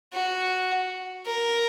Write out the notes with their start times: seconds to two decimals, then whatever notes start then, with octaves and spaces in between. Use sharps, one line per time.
0.13 F#4
1.26 A#4